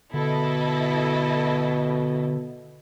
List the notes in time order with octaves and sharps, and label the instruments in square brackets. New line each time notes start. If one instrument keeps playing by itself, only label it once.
[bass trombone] B2 [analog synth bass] D3 [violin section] E4 A4 D#5